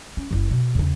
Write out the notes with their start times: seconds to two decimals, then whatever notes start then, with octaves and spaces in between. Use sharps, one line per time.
0.17 C#4
0.31 F#1 E4
0.51 B2
0.75 E2 C#3